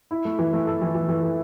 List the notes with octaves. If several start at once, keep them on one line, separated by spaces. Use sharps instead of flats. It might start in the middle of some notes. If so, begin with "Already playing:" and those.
E4
A3
E3
A3
A4
E3
E3
E3
A4